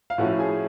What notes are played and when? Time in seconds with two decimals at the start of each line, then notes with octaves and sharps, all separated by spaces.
0.10 F5
0.18 A2 F3 A3 C#4 F#4 F#5
0.39 G#4 G#5